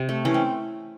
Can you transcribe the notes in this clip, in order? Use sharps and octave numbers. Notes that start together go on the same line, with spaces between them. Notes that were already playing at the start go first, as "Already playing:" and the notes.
Already playing: C3
A3
E3 C#4
C4